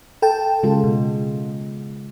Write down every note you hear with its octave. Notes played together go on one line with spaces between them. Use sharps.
A4 G5 A5
C#3 G#3 F4
B2